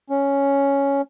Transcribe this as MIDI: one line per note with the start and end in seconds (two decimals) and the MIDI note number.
0.10 1.01 61